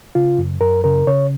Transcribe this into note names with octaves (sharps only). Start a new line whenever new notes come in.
C#3 F4
F#2
F#2 A#4
C#3 A#4
C#3 C#5